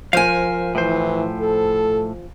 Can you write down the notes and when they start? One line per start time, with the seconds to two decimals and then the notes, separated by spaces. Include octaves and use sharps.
0.13 F3 A#4 C5 F5 G#5
0.75 A2 E3 C5
1.41 A4